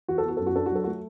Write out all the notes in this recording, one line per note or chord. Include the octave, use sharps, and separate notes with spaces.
E3 F#4
A4
B3 F#4
F#2 A4
F#4
D4 A4
F#4
F#3 A4
F#4
A3